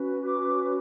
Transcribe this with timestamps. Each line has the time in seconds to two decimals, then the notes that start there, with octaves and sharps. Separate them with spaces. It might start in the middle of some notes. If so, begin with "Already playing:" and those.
Already playing: C#4 F#4 B4
0.24 D6